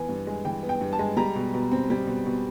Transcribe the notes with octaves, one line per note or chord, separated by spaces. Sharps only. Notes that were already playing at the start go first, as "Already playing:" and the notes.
Already playing: E3 B3 G#5
G2
G#3
E3 G5
B3
G5
G2
A5
G#3
G3 A#5
B2
B2
C4
G3
B2
B2